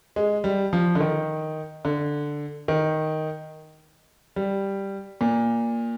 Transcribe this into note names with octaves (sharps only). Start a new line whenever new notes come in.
G#3
G3
F3
D3
D#3
D3
D#3
G3
A#2